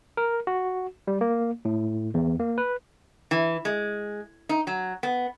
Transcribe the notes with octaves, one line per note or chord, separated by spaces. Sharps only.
A#4
F#4
G3
A#3
A2
E2
A#3
B4
E3
G#3
D#4
F#3
B3